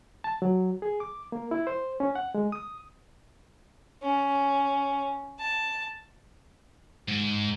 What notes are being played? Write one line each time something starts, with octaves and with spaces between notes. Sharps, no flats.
A5
F#3
G#4
D6
A#3
E4
C5
C#4
F#5
G#3
D#6
C#4
A5
G#2